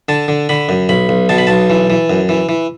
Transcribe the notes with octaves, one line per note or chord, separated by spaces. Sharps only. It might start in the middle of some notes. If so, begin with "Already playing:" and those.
D3 A5
D3
D3 B5
F#2
B1 B5
B1
B2 A5
B5
B1 A5
E3
E3
F#2
E3
E3